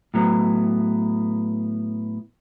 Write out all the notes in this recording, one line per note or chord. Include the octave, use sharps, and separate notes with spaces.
A2 F#3 B3